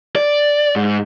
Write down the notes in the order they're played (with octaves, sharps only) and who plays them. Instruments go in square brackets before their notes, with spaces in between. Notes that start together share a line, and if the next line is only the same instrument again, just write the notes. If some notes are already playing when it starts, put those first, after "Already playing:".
[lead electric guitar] D5
G#2